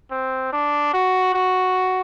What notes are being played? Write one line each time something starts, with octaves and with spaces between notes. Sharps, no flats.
C4
D4
F#4
F#4